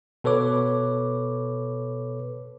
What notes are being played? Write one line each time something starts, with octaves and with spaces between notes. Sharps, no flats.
B2 A4 B4 C#5 D6